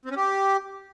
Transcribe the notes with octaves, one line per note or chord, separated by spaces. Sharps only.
C4
C#4
G4